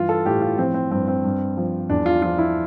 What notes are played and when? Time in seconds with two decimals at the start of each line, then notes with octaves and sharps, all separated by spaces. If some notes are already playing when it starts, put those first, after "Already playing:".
Already playing: G2 E3 F4
0.09 A4
0.26 A2 G4
0.42 F4
0.58 F3 C4
0.74 C4
0.91 G2 C4
1.08 C4
1.24 G2
1.57 F3
1.89 E2 D4
2.06 F4
2.22 F3 F4
2.38 E4